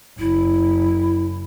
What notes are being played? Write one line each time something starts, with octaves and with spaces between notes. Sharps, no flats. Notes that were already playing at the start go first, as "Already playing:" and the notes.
F#1 E4